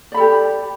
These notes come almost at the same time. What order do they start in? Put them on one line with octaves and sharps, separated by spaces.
D5 B5 A4 G4